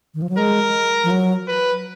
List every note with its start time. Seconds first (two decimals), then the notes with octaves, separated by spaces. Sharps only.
0.14 D#3
0.22 F3
0.29 F#3
0.37 G#3 A#4
1.04 F3
1.11 F#3
1.48 B4